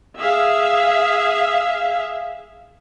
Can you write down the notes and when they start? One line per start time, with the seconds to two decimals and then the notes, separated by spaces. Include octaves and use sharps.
0.19 G#4 E5 F5